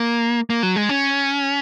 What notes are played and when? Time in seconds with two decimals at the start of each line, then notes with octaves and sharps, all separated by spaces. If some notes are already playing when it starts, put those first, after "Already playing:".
Already playing: A#3
0.50 A#3
0.63 F#3
0.76 G#3
0.89 C#4